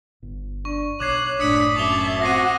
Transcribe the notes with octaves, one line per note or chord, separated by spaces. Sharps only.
G1
D4 C#6
B1 C#5 D6 F#6 G#6 C7
F#1 A2 D4 D#6 B6 C#7 F#7
F#2 E5 A5 D6 F7 G7
C4 F#4 A#6 C7 D#7